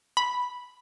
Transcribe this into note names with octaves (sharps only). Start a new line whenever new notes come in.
B5